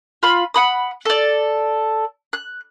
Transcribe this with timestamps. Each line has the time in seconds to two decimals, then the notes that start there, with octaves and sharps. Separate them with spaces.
0.23 F4 B5
0.54 F#5 B5 D#6
1.05 A4 D5
2.33 F#6